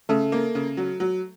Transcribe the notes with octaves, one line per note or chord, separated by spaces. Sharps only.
C#3 A3
A#3
C#3
F#3
F#3